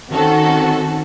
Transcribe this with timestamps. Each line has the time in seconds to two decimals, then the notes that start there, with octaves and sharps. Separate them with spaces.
0.10 D#3 C4 C#4 F#4 A4